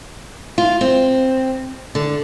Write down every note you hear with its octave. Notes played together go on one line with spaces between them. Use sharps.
F4
C4
D3